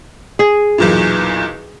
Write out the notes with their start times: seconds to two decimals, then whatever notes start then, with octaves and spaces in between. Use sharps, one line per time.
0.39 G#4
0.78 B1 E2 A#2